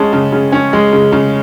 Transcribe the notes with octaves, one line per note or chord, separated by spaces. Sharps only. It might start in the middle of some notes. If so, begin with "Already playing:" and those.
Already playing: G#3 C#4 A5
C#3
C#3
C#4
G#3
C#3
C#3